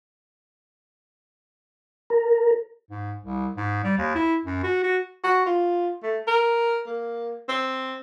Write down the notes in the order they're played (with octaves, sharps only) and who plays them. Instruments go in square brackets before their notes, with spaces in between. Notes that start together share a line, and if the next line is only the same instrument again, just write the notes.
[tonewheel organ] A#4
[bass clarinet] G#2
C2
G#2
G3
D#2
E4
F#2
F#4
F#4
[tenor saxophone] F#4
F4
A3
A#4
A#3
C4